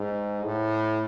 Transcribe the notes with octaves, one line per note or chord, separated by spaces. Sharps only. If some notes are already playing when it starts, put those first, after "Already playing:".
Already playing: G#2
A2